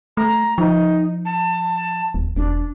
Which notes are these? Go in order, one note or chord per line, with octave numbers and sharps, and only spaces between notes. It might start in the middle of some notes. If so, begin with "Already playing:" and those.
A3 A#5
F3 D#4
A5
D#1
E1 D4